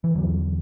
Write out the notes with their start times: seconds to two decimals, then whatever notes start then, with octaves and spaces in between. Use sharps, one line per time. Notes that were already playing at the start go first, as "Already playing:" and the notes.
0.04 E3
0.15 E2 D3 F#3